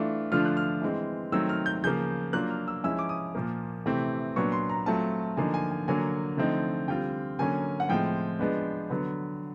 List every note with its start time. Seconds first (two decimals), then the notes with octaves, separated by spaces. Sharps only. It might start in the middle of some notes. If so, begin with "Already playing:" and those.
Already playing: E3 A3 D4 F4
0.32 D3 F3 A3 D4 F4 F6
0.45 F#6
0.57 F6
0.82 E3 G#3 C4
1.32 D#3 F#3 A3 C4 E6
1.49 F6
1.66 G6
1.83 C#3 F3 A#3 G6
2.33 F#3 A#3 D4 F4 F#6
2.50 F6
2.68 E6
2.84 F3 G#3 C#4 E4 E6
2.99 D6
3.09 D#6
3.35 A#2 F3 A#3
3.86 C3 E3 A3 C4
4.36 A#2 F#3 B3 D4 C#6
4.52 C6
4.69 A#5
4.86 F#3 A3 C4 F4 A5
5.37 D3 F3 A#3 D#4 G#5
5.54 G#5
5.71 G#5
5.88 D3 F#3 A#3 G#5
6.37 D3 F3 A3 C4 D#4
6.88 D3 G3 C4 F4 G5
7.39 D3 F#3 A#3 C#4 G#5
7.80 F#5
7.89 A2 F3 G#3 C4 G5
8.39 F3 G#3 B3 D4
8.90 D3 F#3 B3